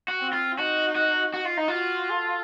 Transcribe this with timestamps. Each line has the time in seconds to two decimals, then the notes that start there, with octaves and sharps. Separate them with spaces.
0.08 F#4
0.20 C4
0.33 F4
0.58 D#4 F#4
0.95 F#4
1.34 F#4
1.45 F4
1.57 D#4
1.68 F4 F#4
2.10 A4